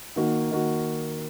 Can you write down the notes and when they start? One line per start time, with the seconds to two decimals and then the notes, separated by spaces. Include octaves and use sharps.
0.16 D#3 A#3 F#4
0.51 D#3 A#3 F#4